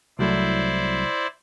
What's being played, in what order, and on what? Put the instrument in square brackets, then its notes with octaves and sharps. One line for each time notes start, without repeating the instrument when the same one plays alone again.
[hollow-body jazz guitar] C2 F#3 A3 [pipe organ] E4 C5 D5